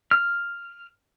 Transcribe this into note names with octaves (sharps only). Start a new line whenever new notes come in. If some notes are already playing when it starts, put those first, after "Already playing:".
F6